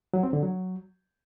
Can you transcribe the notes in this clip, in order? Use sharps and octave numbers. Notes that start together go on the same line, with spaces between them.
F#3
C4
D3
F#3